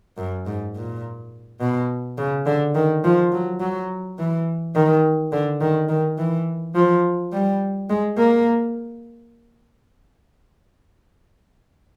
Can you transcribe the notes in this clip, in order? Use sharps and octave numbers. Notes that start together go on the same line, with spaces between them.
F#2
G#2
A#2
B2
C#3
D3
D#3
F3
F#3
F#3
E3
D#3
D3
D#3
D#3
E3
F3
G3
G#3
A#3